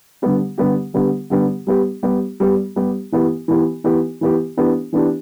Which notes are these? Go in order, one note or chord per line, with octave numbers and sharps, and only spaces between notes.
D3 G3 B3 G4
D3 G3 B3 G4
D3 G3 B3 G4
D3 G3 B3 G4
G3 B3 G4
G3 B3 G4
G3 B3 G4
G3 B3 G4
E3 B3 G4
E3 B3 G4
E3 B3 G4
E3 B3 G4
E3 B3 D4 G4
E3 B3 D4 G4